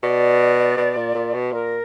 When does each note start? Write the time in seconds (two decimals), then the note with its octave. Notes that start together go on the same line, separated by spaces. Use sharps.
0.03 B2 D5
0.77 B2
0.96 A#2
1.14 A#2
1.34 B2
1.52 A#2 A#4